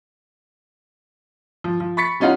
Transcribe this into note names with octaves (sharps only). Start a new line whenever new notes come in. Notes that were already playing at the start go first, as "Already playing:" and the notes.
F3
F3
B5 C#6 A6 B6 C#7
G3 C#4 D#4 F4 F#5